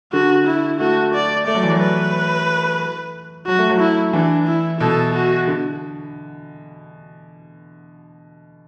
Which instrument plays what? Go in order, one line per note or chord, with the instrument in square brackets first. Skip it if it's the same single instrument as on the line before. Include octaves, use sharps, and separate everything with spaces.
[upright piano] D3 [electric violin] F#4
[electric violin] E4
[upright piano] A3 [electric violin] F#4
[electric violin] D5
[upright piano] A3 [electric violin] D5
[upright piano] F#3
E3
F#3
[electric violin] B4
[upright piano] F#3 [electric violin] F#4
[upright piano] A3
F#3
[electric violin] E4
[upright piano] E3 [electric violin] D4
[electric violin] E4
[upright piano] B2 [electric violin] A4
[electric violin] F#4
[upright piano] D3